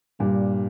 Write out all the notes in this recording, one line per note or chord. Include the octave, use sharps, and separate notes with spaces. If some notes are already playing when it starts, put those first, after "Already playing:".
G2 A#2 G3